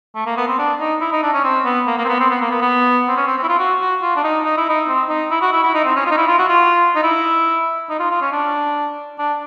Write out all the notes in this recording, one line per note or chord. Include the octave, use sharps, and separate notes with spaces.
A3
A#3
B3
C4
D4
D#4
E4
D#4
D4
C#4
C4
B3
A#3
A#3
C4
B3
C4
B3
A#3
B3
B3
C4
C#4
C4
C4
E4
F4
F#4
F#4
F4
D4
D#4
D#4
E4
D#4
C4
D#4
E4
F#4
E4
E4
D#4
C4
C#4
F4
D#4
E4
F4
F#4
F4
D#4
E4
D#4
F4
F4
C#4
D4
D4